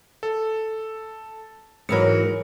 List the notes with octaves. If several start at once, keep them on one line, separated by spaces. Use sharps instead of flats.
A4
G#2 E3 F#3 A#4 C#7